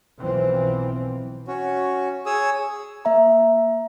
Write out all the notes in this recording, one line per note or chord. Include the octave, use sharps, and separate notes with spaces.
B1 E3 F3 C4
C#4 F#4
G#4 C#5 D#6 E6
A#3 E5 A#5